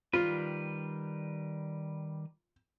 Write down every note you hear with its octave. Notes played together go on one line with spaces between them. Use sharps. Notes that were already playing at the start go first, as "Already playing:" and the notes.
D#3 G3 F4 B4